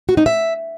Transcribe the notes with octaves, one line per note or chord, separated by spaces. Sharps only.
F#4
D#4
E5